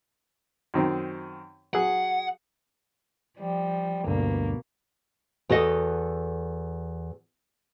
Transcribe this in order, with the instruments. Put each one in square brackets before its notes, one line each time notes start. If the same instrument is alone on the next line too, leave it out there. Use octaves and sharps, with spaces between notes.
[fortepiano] F#2 D#3 C4
[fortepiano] F#3 G#4 [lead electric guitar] F#5
[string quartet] F3 G3
[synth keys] D2 G2 [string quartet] B2 A#3
[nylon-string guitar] E2 F#4 A4 D#5